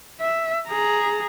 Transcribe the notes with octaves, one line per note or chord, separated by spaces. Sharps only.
E5
G#4 A#5